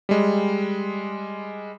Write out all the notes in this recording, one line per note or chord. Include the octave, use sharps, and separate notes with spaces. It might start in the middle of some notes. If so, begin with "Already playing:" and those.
G3 G#3